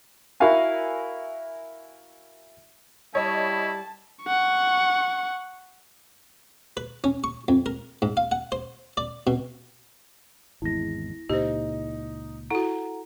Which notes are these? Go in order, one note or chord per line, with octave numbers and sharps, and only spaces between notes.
E4 F#4 A#4 E5 F5 G#5
G3 E4 C#5 D#5 A5
F#5 C#6
B4
C#4
C#6
F2
A#4
G#2
F5
F#5
C5
D5
B2
G#1 E2 G#3 E4 A#6
C#2 A#2 D#4 G4 C5
E4 F#4 A4 F#5 A#5